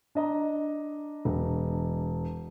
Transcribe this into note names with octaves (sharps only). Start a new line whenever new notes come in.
D4 D#5 A#5
E1